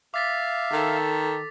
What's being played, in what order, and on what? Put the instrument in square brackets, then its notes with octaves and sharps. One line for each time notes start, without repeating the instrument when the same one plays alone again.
[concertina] E5 F5 [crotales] D6 A6 B6
[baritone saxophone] D#3 [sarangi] A4